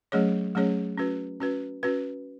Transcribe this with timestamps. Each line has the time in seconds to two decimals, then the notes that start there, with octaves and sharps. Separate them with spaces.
0.12 F#3 A3 C#4 G#4 C#5
0.55 F#3 A3 C#4 G#4 C#5
0.98 C#4 F#4 B4
1.40 C#4 F#4 B4
1.83 C#4 F#4 B4